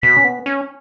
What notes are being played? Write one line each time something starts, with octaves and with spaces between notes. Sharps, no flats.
B2 B6
C#4
B3
C#4